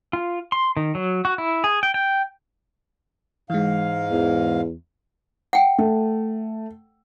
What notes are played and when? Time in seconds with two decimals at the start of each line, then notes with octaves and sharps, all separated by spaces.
0.13 F4
0.52 C6
0.77 D#3
0.95 F#3
1.25 F#4
1.38 E4
1.64 G#4
1.83 G5
1.94 G5
3.50 G#2 E3 G#3 F5
4.11 E2
5.53 F#5 G5
5.78 A3